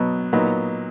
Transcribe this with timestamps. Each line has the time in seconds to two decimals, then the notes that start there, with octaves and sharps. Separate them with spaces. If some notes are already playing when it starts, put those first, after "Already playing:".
Already playing: B2 F#3 B3
0.33 A#2 F#3 B3 D#4